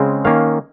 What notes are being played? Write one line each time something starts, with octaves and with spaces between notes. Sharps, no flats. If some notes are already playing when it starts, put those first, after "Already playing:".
Already playing: C#3 G#3 C4
D#3 A#3 C#4 F5